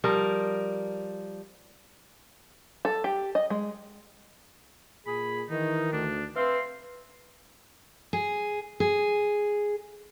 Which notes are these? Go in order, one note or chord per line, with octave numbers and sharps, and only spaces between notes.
F3 G3 A#4
A4
G4
D#5
G#3
A#2 G#4 B5
D#3 E3 D#4
D2 D4
C4 B4 E5 F5 C6
G#4
G#4